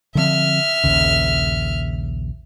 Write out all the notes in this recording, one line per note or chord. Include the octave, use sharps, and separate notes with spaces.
D3 F3 C4 E5 F6
A#1 D#2 C#3